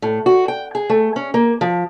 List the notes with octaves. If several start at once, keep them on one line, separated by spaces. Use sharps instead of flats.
A2
F#4
G5
G#4
A3
C#4
A#3
F3